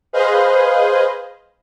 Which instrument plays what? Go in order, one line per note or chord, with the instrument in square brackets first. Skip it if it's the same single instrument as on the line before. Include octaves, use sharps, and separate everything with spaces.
[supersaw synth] G#4 B4 C5 D#5 F5